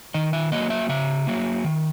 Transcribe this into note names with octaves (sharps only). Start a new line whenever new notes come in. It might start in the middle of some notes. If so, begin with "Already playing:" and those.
D#3 D#5
E5
F#3 A#3 D#5
E5
C#3 E5
F#3 A#3
D#3